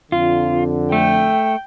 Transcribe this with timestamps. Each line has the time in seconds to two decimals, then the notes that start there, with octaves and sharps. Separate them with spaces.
0.12 F2 D3 F4
0.92 A3 G5